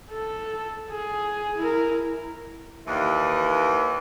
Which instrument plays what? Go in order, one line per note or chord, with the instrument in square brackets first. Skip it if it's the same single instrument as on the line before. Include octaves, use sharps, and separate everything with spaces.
[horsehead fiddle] A4
G#4
E4 A#4
[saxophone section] D#2 E3